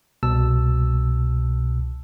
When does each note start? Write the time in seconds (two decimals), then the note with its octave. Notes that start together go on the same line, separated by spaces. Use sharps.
0.23 C2 B2 A5 E6